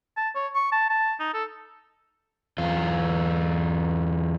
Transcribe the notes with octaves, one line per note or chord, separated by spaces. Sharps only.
A5
C#5
C#6
A5
A5
D#4
A4
E2 F4